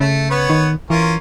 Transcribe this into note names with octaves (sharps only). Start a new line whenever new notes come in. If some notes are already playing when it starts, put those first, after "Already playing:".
C#3 A3
B3 B4 C#5
D#3
E3 C#4 F4 A#4